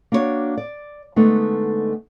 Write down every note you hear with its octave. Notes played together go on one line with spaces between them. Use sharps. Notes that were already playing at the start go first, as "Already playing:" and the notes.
A#3 D4 F#4 G#4 C#5 D5
D5
D3 G#3 A3 B3 D#4